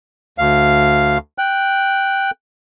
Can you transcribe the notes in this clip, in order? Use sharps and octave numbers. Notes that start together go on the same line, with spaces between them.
D2 F5
G5 F#6